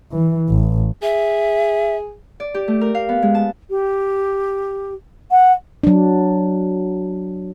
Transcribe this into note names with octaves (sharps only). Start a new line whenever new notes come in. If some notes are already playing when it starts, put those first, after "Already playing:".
E3
A1
G#4 E5
D5
G4
A3
A#4
F5
B3
G#3
A5
G4
F#5
F#3 D4